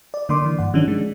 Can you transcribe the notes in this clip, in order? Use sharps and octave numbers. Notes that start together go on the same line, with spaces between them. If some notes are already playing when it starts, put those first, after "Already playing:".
D5
D3 A#3 D5 C6 D6
E3
G2 F#5
D#3 F3 C#4 D4
G#3